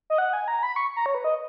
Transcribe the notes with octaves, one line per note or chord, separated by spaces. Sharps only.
D#5
F#5
G#5
A#5
B5
C#6
A#5
C#5
B4
D#5